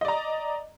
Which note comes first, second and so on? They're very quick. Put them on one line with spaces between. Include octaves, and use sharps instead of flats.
D#5 D5 A#5